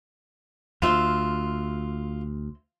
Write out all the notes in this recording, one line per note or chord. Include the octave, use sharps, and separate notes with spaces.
D2 F4 C5 E5